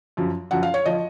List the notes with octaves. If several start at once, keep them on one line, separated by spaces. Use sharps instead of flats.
F#2 F3
F#2 F3 F#5
F5
C#5
F3 D#5